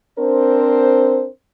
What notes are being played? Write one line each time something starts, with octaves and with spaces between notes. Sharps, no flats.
C4 D4 A#4 C5